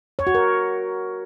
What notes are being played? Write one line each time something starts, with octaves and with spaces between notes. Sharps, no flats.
C#5
F#4
A#4